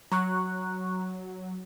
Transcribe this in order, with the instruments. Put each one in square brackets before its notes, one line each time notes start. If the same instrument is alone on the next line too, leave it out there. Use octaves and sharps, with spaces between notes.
[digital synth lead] F#3 [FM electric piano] A#5 C#6 F#6